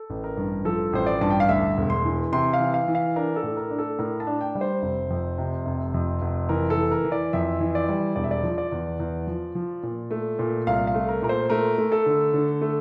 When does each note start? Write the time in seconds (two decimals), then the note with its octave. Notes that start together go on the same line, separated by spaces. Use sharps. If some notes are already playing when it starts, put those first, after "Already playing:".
Already playing: A4
0.10 A1
0.24 A#4
0.37 G2
0.65 F3 A4
0.93 A1 C5
1.06 D5
1.21 G2 A5
1.30 G5
1.40 F5
1.49 D2 E5
1.77 E1
1.90 C6
2.05 E3
2.32 C3 C6
2.53 F5
2.60 E3
2.74 F5
2.88 E3
2.95 F5
3.16 D4 A#4
3.36 A4
3.43 A2
3.57 A#4
3.71 D4
3.79 A4
3.99 A2 A#4
4.20 A5
4.27 D4
4.41 G5
4.55 G3
4.61 C5
4.82 F1
5.10 F2
5.38 C3
5.66 F1
5.94 F2
6.22 F1
6.49 E3 A#4
6.70 A4
6.77 E3
6.91 A#4
7.05 E3
7.12 D5
7.33 F2 E5
7.60 E3
7.75 D5
7.89 G3
8.16 E1 D5
8.24 E5
8.31 D5
8.43 F3
8.58 D5
8.72 E2
9.00 E2
9.27 F3
9.55 F3
9.83 A#2
10.11 A3
10.39 A#2
10.67 C2 F5
10.87 F5
10.94 A3
11.09 A#4
11.22 A#2 A#4
11.29 C5
11.50 A3 A#4
11.78 A3
11.92 A4
12.06 D3
12.33 D3
12.61 A3